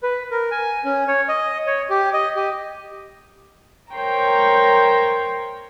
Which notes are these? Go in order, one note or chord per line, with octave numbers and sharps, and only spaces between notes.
B4
A#4
G#5
C#4
C#5
D#5
C#5
G4
D#5
G4
A#4 C5 C#5 G5 A#5